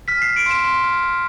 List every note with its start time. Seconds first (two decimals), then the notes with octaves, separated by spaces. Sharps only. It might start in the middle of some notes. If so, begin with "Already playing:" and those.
0.08 F6 B6
0.22 C7
0.28 F6
0.36 D7
0.46 C6 E7
0.64 C6
0.84 F6
1.03 F6